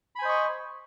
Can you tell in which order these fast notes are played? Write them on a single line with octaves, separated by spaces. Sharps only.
B5 G#5 C5 D#5 C#6